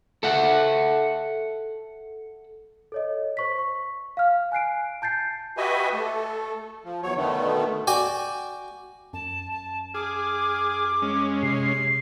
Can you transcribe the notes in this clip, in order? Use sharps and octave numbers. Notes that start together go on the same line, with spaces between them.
A4 E5 F#5
A4 C#5 D#5
C5 C#6 B6
C#6
F5 F6
G#5 F#6 C7 D7
A5 G6 A6 C7
F#4 G4 B4 D#5 E5 G#5
A3 A4
F3
E2 F#3 C#5
B2 D3 D#3 A3 B3
F#4 D5 G5 G#5
F#2 A5
A5
G#4 D6 F6
G#3 C#4
C3 C7